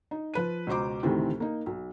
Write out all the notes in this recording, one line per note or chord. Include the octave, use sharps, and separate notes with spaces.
D#4
F3 B4 D#7
C#2 B2 C5 A#5 D6
D2 A2 C3 D#3 E3 C4
A#3 D#4
B1